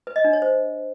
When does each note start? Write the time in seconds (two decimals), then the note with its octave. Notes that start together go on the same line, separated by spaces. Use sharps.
0.07 B4
0.16 D#5
0.24 D4
0.33 C#5
0.42 C5